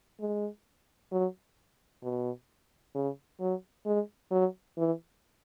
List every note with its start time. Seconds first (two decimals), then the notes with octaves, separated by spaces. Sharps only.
0.20 G#3
1.12 F#3
2.03 B2
2.95 C#3
3.40 F#3
3.86 G#3
4.31 F#3
4.77 E3